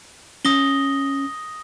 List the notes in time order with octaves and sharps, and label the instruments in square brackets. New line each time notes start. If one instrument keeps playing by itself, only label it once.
[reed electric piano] C#4 [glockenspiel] D#6 A#6 G7